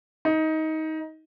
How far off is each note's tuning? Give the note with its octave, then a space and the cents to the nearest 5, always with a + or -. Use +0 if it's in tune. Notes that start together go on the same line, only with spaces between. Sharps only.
D#4 +20